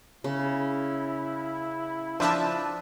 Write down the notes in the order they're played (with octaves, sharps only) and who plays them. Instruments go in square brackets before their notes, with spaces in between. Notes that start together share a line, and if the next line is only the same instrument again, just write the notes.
[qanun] C#3 [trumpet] E4
[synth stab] F3 D4 E5 [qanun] B4 A5